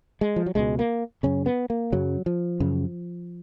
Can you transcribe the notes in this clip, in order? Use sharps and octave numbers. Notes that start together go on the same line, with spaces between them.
G#3
F3
F#3
C#2 B2 G#3
A#3
F#2 C#3 C#4
B3
A#3
F#2 C#3 F#3
F3
F#2 C#3